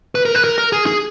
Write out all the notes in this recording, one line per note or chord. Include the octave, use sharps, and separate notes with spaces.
B4
A#4
B4
A#4
A#4
G#4
G#4